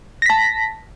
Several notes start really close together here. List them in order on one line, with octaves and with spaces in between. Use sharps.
A#6 B6 A5